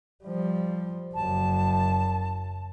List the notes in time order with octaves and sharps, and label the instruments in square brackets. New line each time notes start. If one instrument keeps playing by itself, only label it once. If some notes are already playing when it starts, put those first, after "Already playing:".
[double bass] F3 G3
[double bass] F#1 F#2 [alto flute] A5